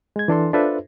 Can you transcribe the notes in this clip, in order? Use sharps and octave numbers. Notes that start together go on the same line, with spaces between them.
G#3 G#6
E3 D4 A4 C6
D4 F4 A4 B4 C5 E5